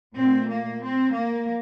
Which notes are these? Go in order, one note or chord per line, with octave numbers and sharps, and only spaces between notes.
A#2 A3 C4
A#3
C4
A#3